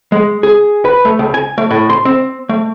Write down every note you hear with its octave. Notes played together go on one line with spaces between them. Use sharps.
G#3
G#4
B4
A3
C#2
G#5
A3
A2
C6
C4
A3